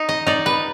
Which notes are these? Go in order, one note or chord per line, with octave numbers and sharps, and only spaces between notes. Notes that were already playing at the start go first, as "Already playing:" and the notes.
Already playing: D#4
D#5
D#4 D5
B4